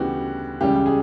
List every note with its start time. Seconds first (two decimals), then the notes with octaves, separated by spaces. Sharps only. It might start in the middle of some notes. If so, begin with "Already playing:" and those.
Already playing: D2 C#3 E3 G3 B3 F#4 G4
0.61 C#2 C#3 E3 G3 G4
0.86 G#4